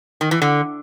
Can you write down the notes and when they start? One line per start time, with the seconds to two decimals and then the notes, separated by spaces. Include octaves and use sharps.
0.21 D#3
0.31 E3
0.42 D3